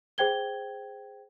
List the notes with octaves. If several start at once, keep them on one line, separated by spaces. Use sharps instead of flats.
G#4 C5 G5 G#6 G7